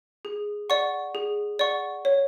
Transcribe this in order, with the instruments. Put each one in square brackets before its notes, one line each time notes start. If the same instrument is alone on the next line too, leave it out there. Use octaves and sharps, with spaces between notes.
[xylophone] G#4
D5 F#5 C#6
G#4
D5 F#5 C#6
C#5